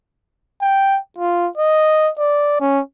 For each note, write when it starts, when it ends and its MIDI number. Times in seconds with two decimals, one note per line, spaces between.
0.61 0.98 79
1.18 1.48 65
1.58 2.10 75
2.18 2.57 74
2.60 2.80 61